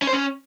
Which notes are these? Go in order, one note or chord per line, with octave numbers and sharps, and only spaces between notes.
C#4
C5
C#4